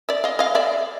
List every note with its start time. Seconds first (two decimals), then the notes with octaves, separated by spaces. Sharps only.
0.09 D5 E5
0.24 D#5 F5
0.39 D#5 F5
0.55 D5 E5